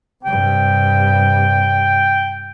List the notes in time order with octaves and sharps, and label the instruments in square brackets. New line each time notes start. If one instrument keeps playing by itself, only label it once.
[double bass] G2 C3 [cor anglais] G5